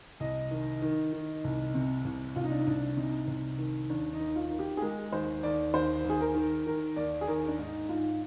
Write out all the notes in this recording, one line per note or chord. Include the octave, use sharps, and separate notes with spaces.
C2 D#5
D#3
D#3
D#3
C2
C3
C2
C2 F4
D#4
D4
D#4
C2 D4
C3 D#4
C2
D#3
D#2 D4
D#4
D#2
F4
D#3
G4
G#4
G#3 A#4
D#2 C5
D#2 D5
D#2 C5
D#2
G#4
A#4
D#3
D#3 A#4
D#2 D5
G#4
D#2 A#4
D4
G#2 D#4
G#2 F4